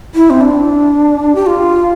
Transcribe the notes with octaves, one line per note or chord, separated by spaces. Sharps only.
E4
C4
D4
G4
F4